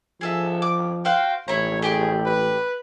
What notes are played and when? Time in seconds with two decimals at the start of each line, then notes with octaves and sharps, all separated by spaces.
0.21 F3 G#4 A4 E5
0.62 D6
1.05 F#4 C5 F5 G5
1.48 A1 E4 C#5 A#5
1.82 A3 G4 G#4 D5
2.26 B4